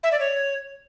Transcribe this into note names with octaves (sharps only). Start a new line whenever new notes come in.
E5
D5
C#5